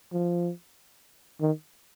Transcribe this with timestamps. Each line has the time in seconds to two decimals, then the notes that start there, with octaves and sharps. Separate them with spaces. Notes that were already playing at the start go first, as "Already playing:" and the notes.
0.12 F3
1.41 D#3